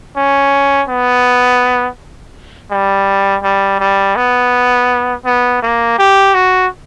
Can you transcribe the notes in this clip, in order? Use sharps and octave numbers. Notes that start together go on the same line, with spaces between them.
C#4
B3
G3
G3
G3
B3
B3
A#3
G4
F#4